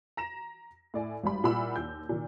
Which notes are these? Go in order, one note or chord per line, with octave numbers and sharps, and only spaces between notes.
A#5 A#6 E7
A2 D5 G#5
G#1 G#2 G3 B5
A#2 G3 E4 F#5 B5 E6
D#2 G6
A#2 D#3